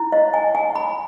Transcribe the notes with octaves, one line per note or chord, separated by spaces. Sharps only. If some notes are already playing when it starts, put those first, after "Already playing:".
Already playing: E4
D#5
G#5
G#5
B5